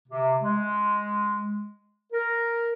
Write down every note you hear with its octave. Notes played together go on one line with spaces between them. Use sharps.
C3
G#3
A#4